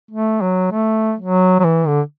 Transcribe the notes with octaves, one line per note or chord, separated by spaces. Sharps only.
A3
F#3
A3
F#3
F#3
E3
D3